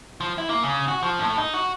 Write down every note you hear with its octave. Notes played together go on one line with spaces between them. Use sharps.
F3
E4
A#3
C#3
F#4
F3
A2
D#4
F#4